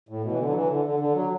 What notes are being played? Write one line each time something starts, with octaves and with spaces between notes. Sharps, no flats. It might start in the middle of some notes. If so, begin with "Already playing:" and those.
A2
B2
E3
D3
F#3
E3
D3
D3
D3
F#3